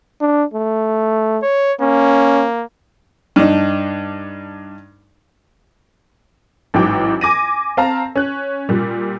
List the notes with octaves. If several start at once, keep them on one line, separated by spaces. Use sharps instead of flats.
D4
A3
C#5
A#3 C#4
G2 D4 D#4
A1 G#2 E3 F#3 G5 D6
G#5 D6 A#6 D#7
C4 F5 A5 A#5
C#4 F#6
A#2 G3